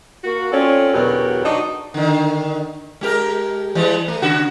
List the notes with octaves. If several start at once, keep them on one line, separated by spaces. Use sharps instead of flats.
A#3 F#4
C4 C#4 F4 A4 C#5 D5
E2 B2 D3 F#3 G4 A#4
D4 D#4 F#4
D3 D#3
G#3 G4 A#4
E3 G3 G#3
A3
C#3 F#4